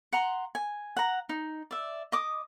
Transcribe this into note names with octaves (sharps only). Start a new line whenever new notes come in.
F#5 A#5 C6
G#5
F#5 A#5
D#4
D5 E5
D#5 D6 D#6